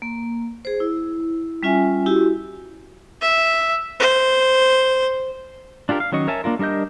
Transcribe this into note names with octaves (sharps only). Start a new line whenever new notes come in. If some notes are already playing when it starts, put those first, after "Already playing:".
A#3
G#4 C5
E4
G3 C#4 F4 E5 G#5
E4 F#4 G4
E5
C5
D4 F4 G4 A#4
F5
D#3 F#3 C#4 D#5 C#6
A#4 C#5 E5 G#5 A5
A#3 D4 F4 A#4
G3 D4 A#4 D#5 G6